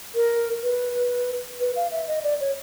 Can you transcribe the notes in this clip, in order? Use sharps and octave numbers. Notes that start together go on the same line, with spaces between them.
A#4
B4
B4
F5
E5
D#5
D5
C#5